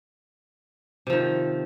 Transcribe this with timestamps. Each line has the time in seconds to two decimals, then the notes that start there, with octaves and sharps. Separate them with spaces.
1.07 C3
1.10 F3
1.13 D#3